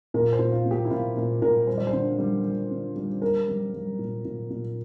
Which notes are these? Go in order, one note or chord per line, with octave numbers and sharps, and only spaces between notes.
A#2 A#4
C5
A#2
F4
A#2
G4
E4
A#2 F4
A#2
A#2 A#4
G3 C5
D5
C5
D3
G3
G3
D3
G3
G3 A#4
G3
G3
A#2
A#2
A#2